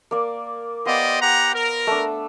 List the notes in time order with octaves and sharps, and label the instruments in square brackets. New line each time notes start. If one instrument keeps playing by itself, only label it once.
[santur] A#3 D5
[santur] B3 C5 F5 [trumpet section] G4 D5 D#5
[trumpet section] G4 F#5 A#5
A#4
[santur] A3 D4